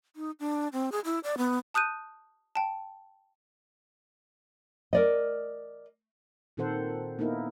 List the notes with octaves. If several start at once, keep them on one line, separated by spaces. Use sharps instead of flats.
D#4
D4
C4
G#4
E4
D5
B3
A5 D#6 F#6 G6 D#7
G5 A5
A#4 D5 D#5
A#2 D#3 C4 A4 C5 F#5
A#3 B3 D#4 E4 A#4